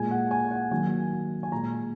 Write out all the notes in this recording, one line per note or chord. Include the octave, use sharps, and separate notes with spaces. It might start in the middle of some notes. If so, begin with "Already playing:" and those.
Already playing: A#2 G#3 G#5
F#5
G#5
F#5
D#3 F#3 A#3 G#5
G#5
A#2 G#3 A#5